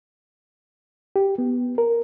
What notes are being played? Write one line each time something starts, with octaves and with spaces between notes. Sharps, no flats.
G4
B3
A#4